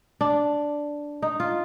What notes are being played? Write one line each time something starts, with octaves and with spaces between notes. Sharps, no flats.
D4
D#4
F4